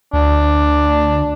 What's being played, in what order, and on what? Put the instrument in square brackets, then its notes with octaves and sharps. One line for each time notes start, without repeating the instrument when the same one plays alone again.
[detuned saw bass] D2 [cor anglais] D4